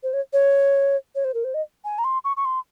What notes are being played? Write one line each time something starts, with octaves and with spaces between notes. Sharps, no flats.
C5
C#5
C#5
C#5
C5
A#4
C5
D#5
G#5
A#5
C6
C#6
C#6
C6